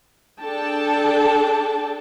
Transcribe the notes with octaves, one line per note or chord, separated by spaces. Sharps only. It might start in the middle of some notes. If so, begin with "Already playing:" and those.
D4 G#4 A4 G5 A5